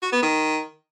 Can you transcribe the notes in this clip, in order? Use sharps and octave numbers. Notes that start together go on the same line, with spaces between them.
F#4
B3
D#3